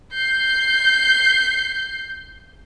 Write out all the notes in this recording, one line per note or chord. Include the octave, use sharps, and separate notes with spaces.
G6 C7